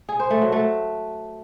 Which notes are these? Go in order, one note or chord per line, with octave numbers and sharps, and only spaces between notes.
G#4
C5
A3
F#3
A3